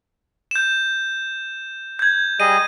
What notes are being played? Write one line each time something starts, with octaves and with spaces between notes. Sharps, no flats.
G6 E7
G6 G#6
G3 G#4 D#5 D#7